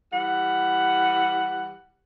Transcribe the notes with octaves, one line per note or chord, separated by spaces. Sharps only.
E3 G3 F#5